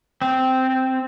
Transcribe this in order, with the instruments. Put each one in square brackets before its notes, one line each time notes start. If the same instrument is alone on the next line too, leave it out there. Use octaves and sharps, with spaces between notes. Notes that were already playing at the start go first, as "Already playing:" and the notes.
[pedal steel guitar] C4